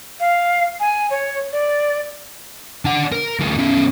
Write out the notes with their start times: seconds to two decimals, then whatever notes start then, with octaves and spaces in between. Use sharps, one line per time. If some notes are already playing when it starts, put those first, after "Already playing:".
0.20 F5
0.80 G#5
1.11 C#5
1.52 D5
2.85 D4 F#5
3.12 A#4
3.39 D2 F4
3.57 B2 C#4